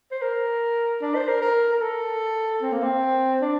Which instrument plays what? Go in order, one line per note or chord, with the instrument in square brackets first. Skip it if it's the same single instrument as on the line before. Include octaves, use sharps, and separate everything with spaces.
[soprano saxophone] C5
A#4
D4
C5
A#4
A#4
A#4
A4
C4
A#3
C4
D4